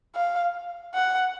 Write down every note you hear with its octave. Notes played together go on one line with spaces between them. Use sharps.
F5
F#5